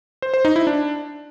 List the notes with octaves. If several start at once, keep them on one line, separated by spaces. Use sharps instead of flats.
C5
C5
D#4
E4
D4